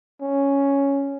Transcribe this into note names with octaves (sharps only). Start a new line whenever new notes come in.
C#4